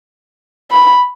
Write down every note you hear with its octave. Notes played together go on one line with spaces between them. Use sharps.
B5